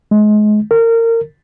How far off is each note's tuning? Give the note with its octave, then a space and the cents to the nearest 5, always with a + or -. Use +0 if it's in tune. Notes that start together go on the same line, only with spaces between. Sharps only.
G#3 +30
A#4 -25